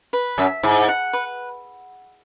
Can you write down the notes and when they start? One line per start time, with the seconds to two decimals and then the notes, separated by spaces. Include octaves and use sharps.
0.13 B4
0.38 F#2 E5
0.63 G#2 E4
0.88 F#5
1.13 B4